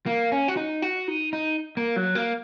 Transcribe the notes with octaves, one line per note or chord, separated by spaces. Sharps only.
A#3
C#4
F#4
D#4
F#4
D#4
D#4
A#3
F#3
A#3